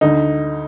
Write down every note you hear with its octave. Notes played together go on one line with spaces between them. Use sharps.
D2 D3 D#4